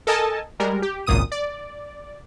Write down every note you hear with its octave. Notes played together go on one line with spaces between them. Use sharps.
A4 A#4 D#5 G#5 A5
G3 G#3 A#4
G4
G#1 C#2 F#2 A#2 D#6 D#7
D5